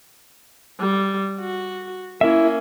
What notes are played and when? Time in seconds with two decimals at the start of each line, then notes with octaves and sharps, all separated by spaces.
0.80 G3
1.39 F#4
2.21 A#3 C#4 E4 E5